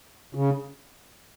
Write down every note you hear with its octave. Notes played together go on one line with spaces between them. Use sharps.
C#3